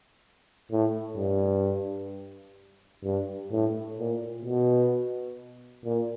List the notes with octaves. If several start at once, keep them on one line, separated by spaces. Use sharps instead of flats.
A2
G2
G2
A2
A#2
B2
A#2